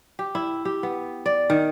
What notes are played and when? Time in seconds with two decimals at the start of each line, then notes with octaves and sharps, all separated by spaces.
0.19 G4
0.35 E4
0.65 G4
0.83 B3
1.26 D5
1.50 D#3